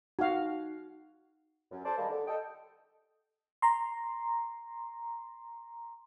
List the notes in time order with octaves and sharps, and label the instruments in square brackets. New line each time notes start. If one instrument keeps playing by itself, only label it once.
[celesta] D#4 [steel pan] F#4 F5
[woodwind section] F#2
A4 C5 D5 A5
D#3 G3 G#3 A#3
D3
A4 D#5 G5
[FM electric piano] A#5 C6